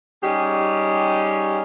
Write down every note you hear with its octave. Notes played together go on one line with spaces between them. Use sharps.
G3 C#4 D#4 G4 G#4